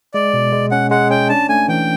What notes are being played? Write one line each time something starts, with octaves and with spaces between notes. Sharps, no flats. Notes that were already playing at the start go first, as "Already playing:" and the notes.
G#3 D5
B2
G#3
C#4 F#5
G#3 F#5
C#4 G5
D4 A5
A3 G#5
E3 G5